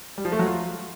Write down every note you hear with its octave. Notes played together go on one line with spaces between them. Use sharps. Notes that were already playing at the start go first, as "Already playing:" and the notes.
G3
F3
A3
F#3
F4